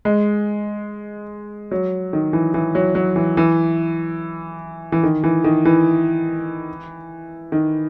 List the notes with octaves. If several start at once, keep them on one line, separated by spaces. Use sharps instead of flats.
G#3
F#3
D#3
E3
E3
F#3
F#3
E3
E3
E3
D#3
E3
D#3
E3
D#3